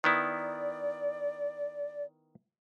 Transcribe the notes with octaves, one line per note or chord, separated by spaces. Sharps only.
D#3 B3 E4 D5